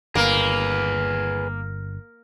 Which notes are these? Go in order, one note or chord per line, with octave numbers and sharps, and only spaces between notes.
G1 A#3 G#4 B4